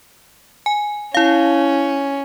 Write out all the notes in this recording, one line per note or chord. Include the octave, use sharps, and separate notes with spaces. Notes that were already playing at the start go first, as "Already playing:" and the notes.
G#5
C#4 E4 F5